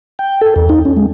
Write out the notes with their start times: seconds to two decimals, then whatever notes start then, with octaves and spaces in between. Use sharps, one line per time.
0.19 G5
0.41 A4
0.56 E2
0.69 D#4
0.85 C#4
0.97 G#3